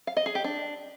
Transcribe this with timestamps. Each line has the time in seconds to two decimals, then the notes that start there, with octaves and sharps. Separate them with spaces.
0.07 F5
0.17 D#5
0.26 G#4
0.35 G4
0.44 D4